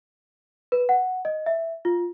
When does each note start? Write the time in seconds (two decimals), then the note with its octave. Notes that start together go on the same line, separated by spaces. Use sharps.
0.72 B4
0.89 F#5
1.25 D#5
1.46 E5
1.85 F4